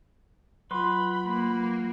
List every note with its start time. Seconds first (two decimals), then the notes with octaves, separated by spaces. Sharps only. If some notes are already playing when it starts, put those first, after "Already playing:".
0.71 F#3 F4 B4 B5 C6
1.26 A#3